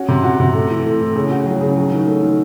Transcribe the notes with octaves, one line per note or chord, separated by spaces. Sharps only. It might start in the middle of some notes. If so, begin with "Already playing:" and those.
Already playing: C#4 F#4
C3
F#4
C3
A3
E3
A3
A2
C#3
F#4
F#3
C#3
F#3
D#3
A3
D#3